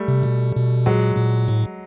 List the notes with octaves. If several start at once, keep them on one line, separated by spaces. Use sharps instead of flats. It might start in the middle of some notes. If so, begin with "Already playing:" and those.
Already playing: G3 A3
C3
B2
B2
A#2 F#3 G#3
A#2
A2